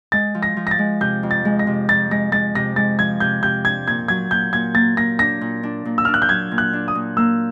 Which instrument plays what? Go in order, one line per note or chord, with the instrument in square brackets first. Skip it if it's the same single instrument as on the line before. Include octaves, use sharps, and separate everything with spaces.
[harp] G#3 [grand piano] A6
[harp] F3
[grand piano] A#6
[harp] F3
[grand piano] A#6
A6
[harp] G#3
[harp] C3 [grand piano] G6
[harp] F2
[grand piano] A6
[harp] G#3
[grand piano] A#6
[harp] C3
[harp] F2 [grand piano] A6
[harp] G#3 [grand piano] A#6
[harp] G#3 [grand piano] A6
[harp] C3 [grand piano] A#6
[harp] G#3 [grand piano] A6
[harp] F3 [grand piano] G#6
[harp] C3 [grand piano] G6
[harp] C3 [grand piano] G6
[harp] D4 [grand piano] G#6
[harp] A#2 [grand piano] G#6
[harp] F#3 [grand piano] G#6
[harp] A#2 [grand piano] G6
[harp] A#2 [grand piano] G#6
[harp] A#3 [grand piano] A6
[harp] A#3 [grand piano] A#6
[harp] D4 [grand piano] A#6
[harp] A#2
D4
A#2
[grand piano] E6
[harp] D4 [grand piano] F6
[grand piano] F#6
G6
[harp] F#3 [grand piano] G#6
[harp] A#2
[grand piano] F#6
[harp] D4
[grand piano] D#6
[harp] A#2
[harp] A#3 [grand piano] E6